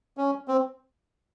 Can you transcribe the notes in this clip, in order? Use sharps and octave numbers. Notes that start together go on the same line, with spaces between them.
C#4
C4